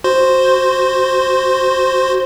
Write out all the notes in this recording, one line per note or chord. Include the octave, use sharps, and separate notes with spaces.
F#4 C5 C6